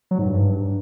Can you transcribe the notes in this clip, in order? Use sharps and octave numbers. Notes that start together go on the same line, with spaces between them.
F#3
G#2
G2